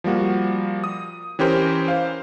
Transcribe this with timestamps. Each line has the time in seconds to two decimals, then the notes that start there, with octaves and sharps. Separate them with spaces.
0.04 F3 G3 A#3 F#4
0.84 D#6
1.39 E3 C#4 G4 A#4 C5
1.88 C5 F5